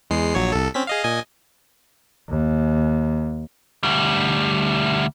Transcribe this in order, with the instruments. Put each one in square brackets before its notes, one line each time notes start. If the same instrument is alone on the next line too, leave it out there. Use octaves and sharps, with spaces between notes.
[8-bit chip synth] E2 G#3 C7
A#1 F#3 C#5
C2 A4
C4 C#4 B6
G#4 D#5 F5
A#2 D#5 G#5
[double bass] D#2
[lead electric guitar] D2 G3